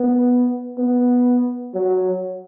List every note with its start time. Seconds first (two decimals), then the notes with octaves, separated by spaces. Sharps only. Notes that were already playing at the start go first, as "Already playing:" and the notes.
Already playing: B3
0.78 B3
1.75 F#3